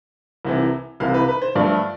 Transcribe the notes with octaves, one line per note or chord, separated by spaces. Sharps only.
C2 C3 E3
C2 C3 E3 F5
B4
B4
C5
G2 F3 A3 D5